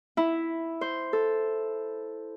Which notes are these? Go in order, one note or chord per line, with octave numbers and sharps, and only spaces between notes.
E4
C5
A4